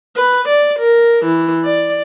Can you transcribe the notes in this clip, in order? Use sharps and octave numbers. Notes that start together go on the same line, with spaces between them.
B4
D5
A#4
E3
D5